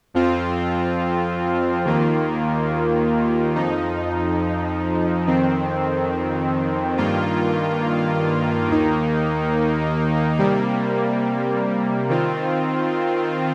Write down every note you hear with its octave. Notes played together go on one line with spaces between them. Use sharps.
F2 F3 C4 F4
D#2 D#3 A#3 F4
F2 F3 D#4
F2 D#3 C4
G2 D#3 A#3 F4
D#2 D#3 A#3 D#4
C3 G3 A#3
D#3 C4 F4